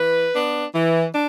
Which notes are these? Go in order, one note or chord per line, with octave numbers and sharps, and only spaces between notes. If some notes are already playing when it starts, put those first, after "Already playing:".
Already playing: E3 B4
B3 D4
E3
D4